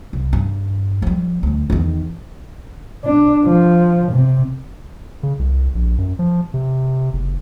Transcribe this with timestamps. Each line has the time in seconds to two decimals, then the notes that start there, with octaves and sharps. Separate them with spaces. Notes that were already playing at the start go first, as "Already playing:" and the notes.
0.13 C2
0.33 G2
1.02 F3 G3
1.43 D2 D3
1.70 E2 D#3
3.04 D4
3.45 F3
4.12 C3
5.23 C#3
5.39 C2
5.75 A#1
5.98 F#2
6.19 F3
6.54 C3
7.13 F#1